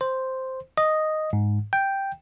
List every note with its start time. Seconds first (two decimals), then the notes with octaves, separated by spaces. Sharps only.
0.01 C5
0.78 D#5
1.33 G#2
1.73 G5